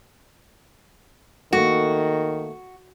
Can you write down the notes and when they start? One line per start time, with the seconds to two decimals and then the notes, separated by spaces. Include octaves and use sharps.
1.53 D#3 A3 A#3 F#4